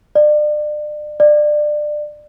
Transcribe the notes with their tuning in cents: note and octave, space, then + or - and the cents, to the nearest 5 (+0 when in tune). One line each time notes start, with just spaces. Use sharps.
D5 +35
D5 +25